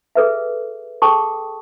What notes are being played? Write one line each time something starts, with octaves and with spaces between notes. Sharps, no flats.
G#4 A4 B4 E5
G#4 A4 G5 A5 C#6 D#6